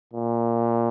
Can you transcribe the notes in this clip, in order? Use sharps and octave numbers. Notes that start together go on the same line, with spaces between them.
A#2